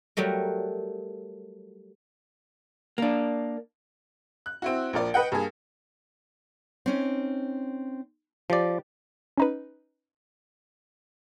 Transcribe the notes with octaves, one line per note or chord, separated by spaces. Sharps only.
F#3 G3 A3 A#4
A#3 D4
F#6
C4 E4 F#4
A#1 F3 A#4 D5
B4 D#5 F#5 G5
G2 A#3 G#4
C4 C#4 D#4
F3 G4 D5
C#4 D#4 B4